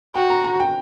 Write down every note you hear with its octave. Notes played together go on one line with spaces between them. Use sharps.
F#4 G5
A#5
A#5
G5